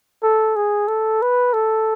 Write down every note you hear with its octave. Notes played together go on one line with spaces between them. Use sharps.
A4
G#4
A4
B4
A4